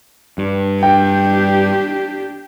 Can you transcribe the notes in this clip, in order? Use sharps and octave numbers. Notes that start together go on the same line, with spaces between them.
G2
D4 G4 G5